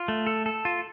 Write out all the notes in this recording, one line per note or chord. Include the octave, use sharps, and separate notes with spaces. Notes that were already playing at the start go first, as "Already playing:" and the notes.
Already playing: F4
A3
A4
A4
F4